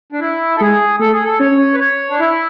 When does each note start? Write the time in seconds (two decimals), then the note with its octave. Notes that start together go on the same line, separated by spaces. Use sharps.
0.12 D4
0.20 E4
0.56 A4
0.60 G#3 G#4
1.00 A3 A4
1.12 G#4
1.24 A4
1.40 C#4 C#5
1.74 B4
1.80 C#5
2.10 D4
2.20 E4